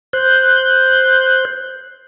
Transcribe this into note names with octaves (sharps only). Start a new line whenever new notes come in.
C5 F#6 G6